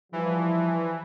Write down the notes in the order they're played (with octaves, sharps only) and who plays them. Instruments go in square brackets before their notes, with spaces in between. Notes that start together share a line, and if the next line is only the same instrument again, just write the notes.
[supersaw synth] E3 [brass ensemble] F3 G3